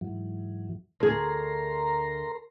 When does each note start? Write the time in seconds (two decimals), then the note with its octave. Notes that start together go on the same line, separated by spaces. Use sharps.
0.01 G#2 E3 F#3
1.00 D2 G#4 A#4 A#5 C6